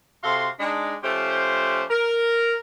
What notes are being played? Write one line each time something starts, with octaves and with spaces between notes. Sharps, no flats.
C3 F#4 A4 F5 C6
G#3 D4 D#4
F3 A3 C#4 G4 C5
A#4